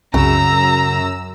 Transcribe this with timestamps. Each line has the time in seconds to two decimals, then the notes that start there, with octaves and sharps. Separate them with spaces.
0.14 C2 F#2 C#3 A#5 E6